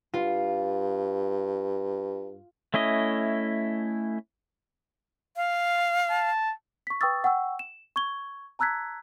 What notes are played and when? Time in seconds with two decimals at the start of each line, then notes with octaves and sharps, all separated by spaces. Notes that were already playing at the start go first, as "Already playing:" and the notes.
0.14 G2 F4
2.74 A3 C#4 E4 D#5
5.36 F5
6.10 A5
6.87 C#6 B6
7.01 B4 G5 C#6 D#6 E6 A6
7.24 F#5 G5 C#6 E6
7.59 E7
7.96 C#6 G#6 G7
8.59 A5 A#5 E6 F#6 G#6 B6